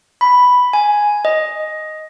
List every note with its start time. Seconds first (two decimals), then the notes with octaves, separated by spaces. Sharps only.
0.21 B5
0.73 G#5
1.25 D#5